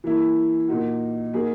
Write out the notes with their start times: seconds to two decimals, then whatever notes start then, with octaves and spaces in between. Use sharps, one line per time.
0.04 E3 A#3 E4
0.68 A#2 A#3 D#4 F#4
1.33 F#3 A#3 D#4 G#4